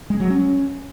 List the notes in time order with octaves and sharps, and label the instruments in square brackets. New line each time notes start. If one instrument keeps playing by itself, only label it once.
[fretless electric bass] G#3
F#3
C#4